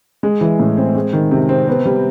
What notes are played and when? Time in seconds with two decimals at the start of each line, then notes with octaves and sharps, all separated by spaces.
0.23 G#3
0.41 E3
0.59 A2
0.77 C4
0.95 G#3
1.13 D#3
1.31 C3
1.49 C4
1.68 B3
1.85 G3